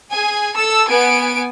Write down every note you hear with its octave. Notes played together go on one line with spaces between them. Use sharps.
G#4 G#5
A4 E6
B3 G#5 D7